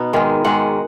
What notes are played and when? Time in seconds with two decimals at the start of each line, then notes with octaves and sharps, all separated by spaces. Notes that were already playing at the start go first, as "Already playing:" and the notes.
Already playing: B2 B3 D#4
0.13 G#2 D#3 G#3
0.44 G#2 D#3 G#3 F#5